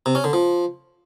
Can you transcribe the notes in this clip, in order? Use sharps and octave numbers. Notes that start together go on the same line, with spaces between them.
C3
C#4
D3
F3